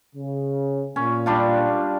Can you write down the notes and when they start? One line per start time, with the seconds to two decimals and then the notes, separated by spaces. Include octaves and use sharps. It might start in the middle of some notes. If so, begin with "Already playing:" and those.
0.15 C#3
0.96 A#2 C#4
1.26 G3 D4 F4